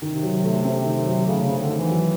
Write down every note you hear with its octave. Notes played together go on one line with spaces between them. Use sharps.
C3 D#3
F#3
A3
C4
D#3
F#3
C#3 A3
C#3
C4
D3
D#3
E3
F#3